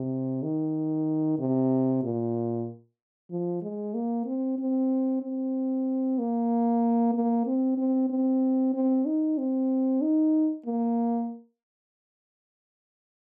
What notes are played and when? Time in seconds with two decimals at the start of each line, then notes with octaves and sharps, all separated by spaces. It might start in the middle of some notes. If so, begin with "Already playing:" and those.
Already playing: C3
0.43 D#3
1.39 C3
2.03 A#2
3.31 F3
3.62 G#3
3.94 A#3
4.26 C4
4.58 C4
5.22 C4
6.19 A#3
7.14 A#3
7.47 C4
7.78 C4
8.10 C4
8.74 C4
9.05 D#4
9.38 C4
10.01 D#4
10.66 A#3